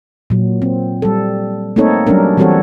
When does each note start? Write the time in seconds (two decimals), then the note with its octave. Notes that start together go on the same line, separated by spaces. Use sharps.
0.30 A#2 F#3
0.62 C4
1.02 G3 A4
1.76 A3 A#3 C4 D#4 A4 C#5
2.07 F#3 G3 C#4 D4 A#4
2.37 E3 G3 C4 F#4 A4 C#5